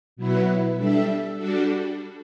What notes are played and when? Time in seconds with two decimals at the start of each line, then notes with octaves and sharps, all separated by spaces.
0.16 B2 F#3 B3 E4 B4
0.77 G3 D4 A4 E5
1.37 G3 D4 F#4 A4